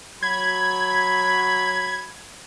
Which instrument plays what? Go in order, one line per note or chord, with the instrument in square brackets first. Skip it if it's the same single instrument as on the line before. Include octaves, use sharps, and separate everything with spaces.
[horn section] F#3 B5 [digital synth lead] G#6